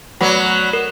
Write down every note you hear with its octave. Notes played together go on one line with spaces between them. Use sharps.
F#3 A3 B3 D5
A#4